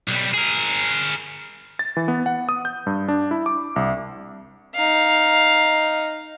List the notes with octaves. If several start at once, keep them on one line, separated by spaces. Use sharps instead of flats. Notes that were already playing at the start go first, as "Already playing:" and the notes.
B1 G3
G#4 A#4
A6
E3
B3
F#5
D#6
G6
G2
D4
E4
D6
C2
D#4 F5